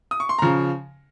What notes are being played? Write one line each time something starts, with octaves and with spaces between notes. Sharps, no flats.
D#6
C#6
C6
C#3 F3 A#5